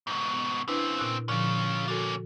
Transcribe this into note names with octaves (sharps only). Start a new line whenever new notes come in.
G#2 B2
C#3 C4 D4 E4 B4
A#2 E6 F#6
A#2 D3 F3 C#4 F4
A#3 C#4 F#4 A4